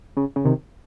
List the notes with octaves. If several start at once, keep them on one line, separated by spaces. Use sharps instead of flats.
C#3
C#3
C3 D#3